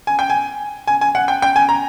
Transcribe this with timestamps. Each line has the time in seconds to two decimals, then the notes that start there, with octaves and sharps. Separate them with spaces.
0.07 G#5
0.19 G5
0.30 G#5
0.87 G#5
1.01 G#5
1.15 F#5
1.28 G5
1.42 G5
1.56 G#5
1.69 A#5